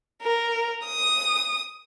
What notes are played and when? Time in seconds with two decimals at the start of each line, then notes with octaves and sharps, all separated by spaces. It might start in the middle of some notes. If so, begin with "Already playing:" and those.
0.22 A#4
0.86 D#6